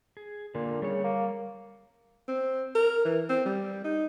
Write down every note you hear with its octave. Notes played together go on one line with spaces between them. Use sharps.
G#4
A#2 D3 A#3
C#3 G3 C#5
A#3
C4
A#4
E3
C4
G3
D#4